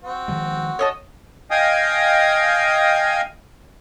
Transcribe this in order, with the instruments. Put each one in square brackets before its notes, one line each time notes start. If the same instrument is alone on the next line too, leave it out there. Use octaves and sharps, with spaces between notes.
[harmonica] C4 F#4
[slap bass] D#3 F3 G#3
[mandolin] C#5 D#5 A5
[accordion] D#5 F5 G5 G#5 D#6